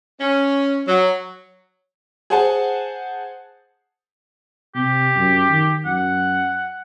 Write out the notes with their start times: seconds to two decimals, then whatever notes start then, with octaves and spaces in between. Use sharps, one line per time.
0.20 C#4
0.87 F#3
2.30 G#4 C5 F#5 G#5 A5
4.75 C3 G4
5.16 F#2
5.50 D#3
5.85 F#2 F#5